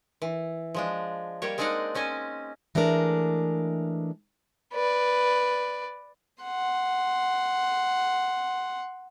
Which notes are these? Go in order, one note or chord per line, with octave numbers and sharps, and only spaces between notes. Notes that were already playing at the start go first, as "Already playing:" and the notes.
E3
F3 G#3 D4
G3 A#3 G4 C#5
G#3 C4 D4 D#4 F5 F#5
C4 C#4 D#5 G#5
E3 G#3 A3 D4 A#4
B4 D5
F#5 C6